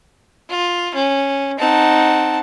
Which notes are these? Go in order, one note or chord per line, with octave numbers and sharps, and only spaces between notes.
F4
C#4
C4 D#4 F#5 A5